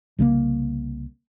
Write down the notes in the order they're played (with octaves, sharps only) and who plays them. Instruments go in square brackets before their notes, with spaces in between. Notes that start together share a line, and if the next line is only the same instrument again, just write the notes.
[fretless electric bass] C2 C#3 G#3 A#3